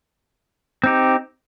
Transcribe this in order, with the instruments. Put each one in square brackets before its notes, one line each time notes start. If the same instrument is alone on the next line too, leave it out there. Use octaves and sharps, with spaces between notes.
[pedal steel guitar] C4 D#4 G4